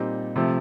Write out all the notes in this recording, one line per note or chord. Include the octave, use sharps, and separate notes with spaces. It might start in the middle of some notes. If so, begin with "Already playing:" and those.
Already playing: A#2 G3 C4 D#4
C3 F3 A3 C4